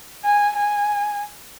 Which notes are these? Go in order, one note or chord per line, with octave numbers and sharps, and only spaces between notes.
G#5
G#5